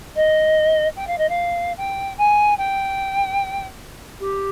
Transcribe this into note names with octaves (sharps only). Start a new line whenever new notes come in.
D#5
G5
F5
D#5
F5
G5
G#5
G5
G4